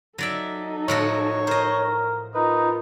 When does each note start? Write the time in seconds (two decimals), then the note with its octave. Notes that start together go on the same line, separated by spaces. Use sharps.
0.18 F#3 D#4 A4 D5 E5
0.88 A2 F3 F#4 C#5
1.47 A#4 C5 D#5
2.35 D#4 F4 A#4 B4